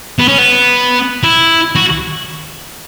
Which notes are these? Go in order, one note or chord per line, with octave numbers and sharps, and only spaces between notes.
B3
C#4
B3
E4
F#4